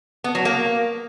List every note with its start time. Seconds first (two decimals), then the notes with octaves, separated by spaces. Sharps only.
0.24 B3
0.35 F#3
0.45 A#3